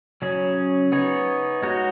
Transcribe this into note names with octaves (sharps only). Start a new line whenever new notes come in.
C#3 F#3 C#4 G#4
B3 D#4 G#4 C#5
G#3 D#4 F#4 C#5